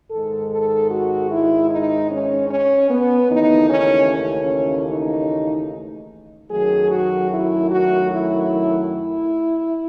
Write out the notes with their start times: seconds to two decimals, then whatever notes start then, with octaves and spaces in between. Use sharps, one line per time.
0.10 G#2 D#3 G#3 A4
0.50 A4
0.90 F#4
1.30 E4
1.70 D#4
2.10 C#4
2.50 C#4
2.90 B3
3.30 D#2 C#3 E3 A3 D#4
3.70 C#4
4.10 C#4
4.90 D#4
6.50 F#2 D#3 F#3 A3 G#4
6.90 F#4
7.31 E4
7.70 F#4
8.11 E4
8.90 E4